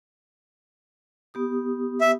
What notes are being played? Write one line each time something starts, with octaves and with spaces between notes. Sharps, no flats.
B3 G4 D#6
E5